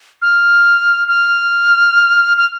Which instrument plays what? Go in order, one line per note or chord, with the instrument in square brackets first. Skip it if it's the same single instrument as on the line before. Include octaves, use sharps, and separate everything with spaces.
[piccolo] F6
F6
F6